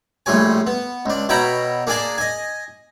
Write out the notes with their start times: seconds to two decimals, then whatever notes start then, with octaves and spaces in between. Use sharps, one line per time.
0.26 A#1 A2 F3 G3 C#5 G#5
0.67 B3
1.06 C#2 D4
1.29 B2 C#5 E5 G5 A#5 B5
1.87 A#3 D4 G#4 D5 G#5 A5
2.18 D#5 G#5